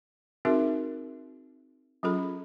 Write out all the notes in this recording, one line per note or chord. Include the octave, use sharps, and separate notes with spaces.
C4 D#4 F#4 G#4 A#4 E5
F#3 C#4 F4 G#4 A4 B5